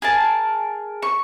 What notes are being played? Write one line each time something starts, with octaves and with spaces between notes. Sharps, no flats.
G#4 A#4 A5
C#6